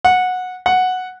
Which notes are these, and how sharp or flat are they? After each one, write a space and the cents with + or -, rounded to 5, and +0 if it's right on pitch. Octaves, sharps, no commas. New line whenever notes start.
F#5 -15
F#5 -5